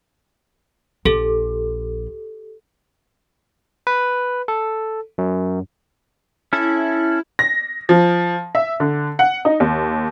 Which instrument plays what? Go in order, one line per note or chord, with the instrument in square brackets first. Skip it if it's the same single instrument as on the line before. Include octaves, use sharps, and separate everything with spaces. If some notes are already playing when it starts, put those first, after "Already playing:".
[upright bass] A#1 [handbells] G4 A4
[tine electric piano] B4
A4
F#2
[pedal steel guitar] C#4 A4 [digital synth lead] E4
[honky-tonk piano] A#6
F3
E5
D3
F#5
D#4
D#2